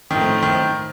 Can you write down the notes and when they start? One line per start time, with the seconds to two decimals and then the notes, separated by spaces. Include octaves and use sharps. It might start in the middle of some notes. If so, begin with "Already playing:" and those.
0.10 A2 D#3 F3 A3 C4
0.43 D#3